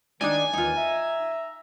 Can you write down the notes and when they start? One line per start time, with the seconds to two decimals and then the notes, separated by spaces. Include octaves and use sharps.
0.21 D#3 G#3 D4 D#4 D5 G#5
0.53 D#2 D#3 E3 D#4 F4
0.76 E5 A#5